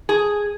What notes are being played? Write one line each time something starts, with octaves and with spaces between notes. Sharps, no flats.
G#4